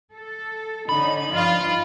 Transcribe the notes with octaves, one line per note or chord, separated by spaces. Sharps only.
A4
D3 C#4 D#4 B5
G2 F3 D#4 F4